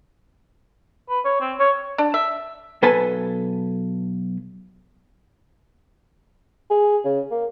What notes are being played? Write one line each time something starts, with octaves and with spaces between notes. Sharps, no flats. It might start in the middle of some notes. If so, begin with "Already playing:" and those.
B4
C#5
C4
C#5
D4
E5
B1 A4 B4 G#5 A5
G#4
C#3
A#3